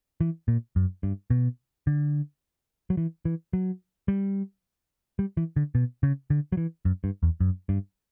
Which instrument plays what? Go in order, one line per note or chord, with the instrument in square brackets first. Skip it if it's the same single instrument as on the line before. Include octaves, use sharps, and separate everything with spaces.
[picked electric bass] E3
A#2
F#2
G2
B2
D3
F#3
E3
E3
F#3
G3
G3
E3
D3
B2
C#3
D3
F#3
E3
F#2
G2
E2
F#2
G2